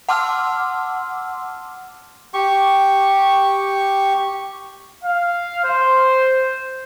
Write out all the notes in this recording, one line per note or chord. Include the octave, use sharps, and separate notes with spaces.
F#5 A5 C6 D6 E6 F6
G4 C#6
F5
C5